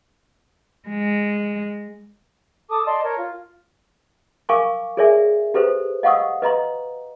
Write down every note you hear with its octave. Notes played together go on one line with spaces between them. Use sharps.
G#3
A4 A5 D6 D#6
D5 D#5 A5 C6
A#4 C#5
F4
A#4 F5 G#5 C#6 D6
G#4 A#4 C#5 D5 E5 G#5
G4 A4 B4 C5
D#5 F5 F#5 C#6 D#6 E6
B4 D#5 A#5 C6